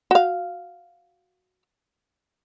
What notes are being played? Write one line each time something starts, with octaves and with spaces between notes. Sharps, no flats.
F#4 F5